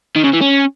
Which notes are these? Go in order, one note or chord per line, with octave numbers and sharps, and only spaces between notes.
D#3
C#3
E3
C#4